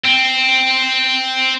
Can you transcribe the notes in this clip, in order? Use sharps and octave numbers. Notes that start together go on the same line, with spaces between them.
C4